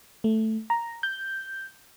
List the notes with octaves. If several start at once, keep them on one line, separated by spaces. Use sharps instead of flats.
A3
A#5
G6